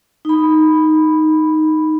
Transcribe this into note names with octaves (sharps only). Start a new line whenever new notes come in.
D#4 B5